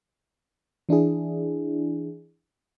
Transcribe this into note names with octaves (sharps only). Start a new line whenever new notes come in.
E3 D4 E4 G#4